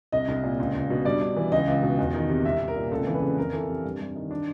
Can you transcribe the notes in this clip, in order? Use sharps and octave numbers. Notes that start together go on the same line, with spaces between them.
C2 D#5
C2
A#2
C#2
C#2
B2
G2 D5
G2
E3
C#2 D#5
C#2
B2
E2
D#3
C3
C2 E5
C2
A#4
A#2
C#2 A4
E3
B4
C#3
F2 A#4
E3 A4
C3
G2
G2
D#3
D4